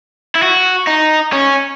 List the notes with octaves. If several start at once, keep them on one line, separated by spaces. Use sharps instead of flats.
E4
F#4
D#4
C#4